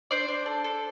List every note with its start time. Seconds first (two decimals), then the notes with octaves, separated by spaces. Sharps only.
0.11 D4 C5 D5
0.28 D4
0.46 A4
0.64 A4